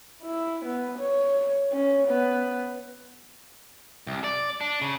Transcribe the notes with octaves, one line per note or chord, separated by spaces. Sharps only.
E4
B3
C#5
C#4
B3
C2
D5
D4
C#3